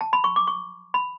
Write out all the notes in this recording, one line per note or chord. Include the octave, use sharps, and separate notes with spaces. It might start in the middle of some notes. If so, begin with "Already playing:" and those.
A5
B5
C#6
D6
C#6
B5